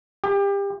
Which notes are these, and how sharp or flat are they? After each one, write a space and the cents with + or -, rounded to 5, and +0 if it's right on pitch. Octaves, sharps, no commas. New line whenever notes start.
G4 +30